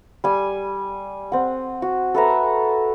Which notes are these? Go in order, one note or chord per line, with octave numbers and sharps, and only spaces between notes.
G3 G#5
C4 F#5
F#4
A4 B4 E5 A#5